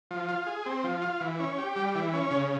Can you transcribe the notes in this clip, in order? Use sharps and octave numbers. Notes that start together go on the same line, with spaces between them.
F3
F4
G#4
C4
F3
F4
E3
C#4
G4
G3
E3
C#4
C#3